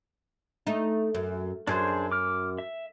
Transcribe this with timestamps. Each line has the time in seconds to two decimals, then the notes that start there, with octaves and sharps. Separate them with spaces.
0.67 A3 D#4
1.15 F#2
1.67 F#2 D4 G#4 C5
2.12 D6 F6
2.58 E5